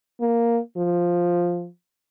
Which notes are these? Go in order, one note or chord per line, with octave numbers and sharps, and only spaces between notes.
A#3
F3